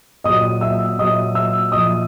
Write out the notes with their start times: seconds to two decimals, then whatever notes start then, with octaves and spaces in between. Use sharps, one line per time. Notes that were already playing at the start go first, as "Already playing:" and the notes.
0.24 A#2 F#3 D#5 D#6
0.61 E5 E6
0.98 A#2 F#3 D#5 D#6
1.35 E5 E6
1.72 A#2 F3 D#5 D#6